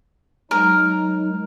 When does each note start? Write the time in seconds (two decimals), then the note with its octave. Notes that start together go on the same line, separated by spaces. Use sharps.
0.51 F#3 G#3 D#4 A#4